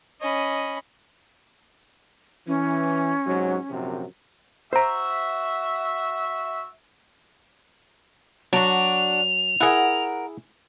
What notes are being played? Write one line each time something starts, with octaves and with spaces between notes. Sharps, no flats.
C#4 D#5 B5
E3 C#4
G#2 C3 F#3
A#1 F#2 C3
F#4 C5 E5 A#5
F#3 D4 F#4 F7
E4 G#4 A#4 F#5